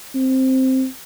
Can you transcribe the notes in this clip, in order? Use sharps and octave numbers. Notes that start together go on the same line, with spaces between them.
C4